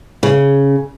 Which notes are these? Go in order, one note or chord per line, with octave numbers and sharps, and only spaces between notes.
C#3